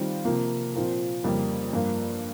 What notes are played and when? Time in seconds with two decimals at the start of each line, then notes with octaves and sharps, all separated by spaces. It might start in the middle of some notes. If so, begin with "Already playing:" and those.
Already playing: D#3 G3 C4 F4
0.25 C3 F3 A#3
0.74 A#2 F3 C4 F4 A#4
1.24 F2 C#3 G3 A#3
1.73 G2 F3 A#3 F4